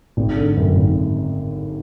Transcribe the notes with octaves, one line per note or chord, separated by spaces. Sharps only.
G#1
D3
F#2
G#1